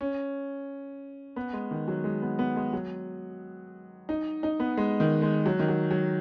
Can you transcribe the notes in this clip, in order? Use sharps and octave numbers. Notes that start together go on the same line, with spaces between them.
C#4
B3
G#3
D#3
F#3
G#3
B3
B3
G#3
F#3
D#4
D#4
B3
G#3
D#3
G#3
F#3
D#3
F#3
F#3